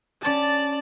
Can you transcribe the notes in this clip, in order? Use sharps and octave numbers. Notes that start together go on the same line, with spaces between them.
C#4 G4 D5 A5